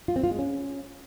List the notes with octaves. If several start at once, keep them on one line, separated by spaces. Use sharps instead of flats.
F4
C4
F4
G#3
C#4